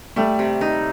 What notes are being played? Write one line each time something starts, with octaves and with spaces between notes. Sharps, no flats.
G3 A3
C3
D#4